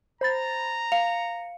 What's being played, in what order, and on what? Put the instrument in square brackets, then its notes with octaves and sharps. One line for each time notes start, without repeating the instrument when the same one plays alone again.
[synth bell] C5 B5 A6 [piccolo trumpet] A#5
[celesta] F5 F7 [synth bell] C#7